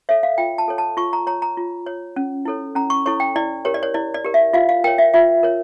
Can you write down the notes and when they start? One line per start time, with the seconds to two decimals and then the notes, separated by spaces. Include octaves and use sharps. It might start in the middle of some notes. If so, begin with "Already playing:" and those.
0.09 A4 C#5 E5
0.23 F5
0.38 F4 G5
0.58 A5
0.68 A4 C#5
0.78 A5
0.97 F4 C#6
1.13 A#5
1.27 C#5 A#5
1.42 A#5
1.57 F4
1.87 C#5
2.16 C#4
2.45 E4 A4 C#5
2.75 C#4 A#5
2.90 C#6
3.06 E4 A4 C#5 C#6
3.20 G5
3.36 E4 D5
3.65 G4 A#4 C#5
3.74 D5
3.83 C#5
3.94 E4 D5
4.14 D5
4.24 G4 A#4
4.34 E5
4.53 F4 F5
4.69 F5
4.84 A#4 C#5 G5
4.98 E5
5.14 F4 E5
5.43 A#4 C#5